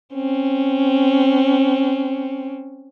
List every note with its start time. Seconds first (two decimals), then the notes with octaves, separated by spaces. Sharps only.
0.15 C4 C#4